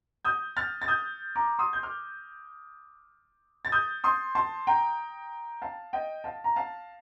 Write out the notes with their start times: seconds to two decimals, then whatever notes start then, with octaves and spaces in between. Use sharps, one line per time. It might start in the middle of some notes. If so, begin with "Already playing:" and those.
0.25 D#6 G6
0.57 F6 A6
0.82 A6
0.88 D#6 G6
1.36 A#5 D6
1.59 C6 D#6
1.73 G6
1.83 D6 F6
3.65 A6
3.72 D#6 G6
4.04 C6 D#6
4.35 A5 C6
4.67 G5 A#5
5.62 F5 A5
5.93 D#5 G5
6.24 F5 A5
6.44 A#5
6.56 F5 A5